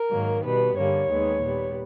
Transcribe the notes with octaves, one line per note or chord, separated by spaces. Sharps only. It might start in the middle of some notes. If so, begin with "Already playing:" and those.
Already playing: A#4
G#2 D#3 F#3 A#3
B2 G3 B3 B4
G2 D3 G3 A#3 C#5
D#2 D#3 G#3 B3
A#2 G3 B3